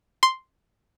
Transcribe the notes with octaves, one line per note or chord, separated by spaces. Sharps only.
C6